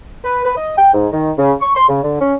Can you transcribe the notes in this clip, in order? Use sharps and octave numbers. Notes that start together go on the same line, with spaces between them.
B4
B4
D#5
G5
G#2
D#3
C#3
C#6
C6
C#3
D3
C#4